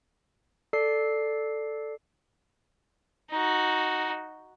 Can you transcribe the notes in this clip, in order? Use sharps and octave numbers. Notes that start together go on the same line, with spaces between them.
A4 D5 C7
D#4 F#4